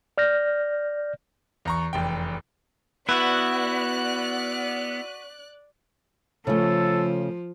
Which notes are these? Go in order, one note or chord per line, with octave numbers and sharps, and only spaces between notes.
D5 F6 G6 A#6
E2 A#5 C#6
F1 E2 G5
B3 E4 F#4 B4 D5 F#6
C#3 F3 A3 A4